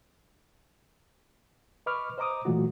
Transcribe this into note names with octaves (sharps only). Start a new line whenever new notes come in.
B4 D#5 B5 C#6 D6 F6
C5 D#5 A#5 D6 D#6
A#2 E3 F#3 A3 F4 F#4